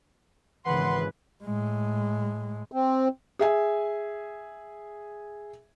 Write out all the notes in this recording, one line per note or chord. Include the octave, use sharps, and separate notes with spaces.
G#1 C#3 E3 B4 F#5 C6
A2 G#3
C4
G#4 E5 G#5